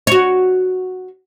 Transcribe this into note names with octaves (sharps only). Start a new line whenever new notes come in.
F#4 C#5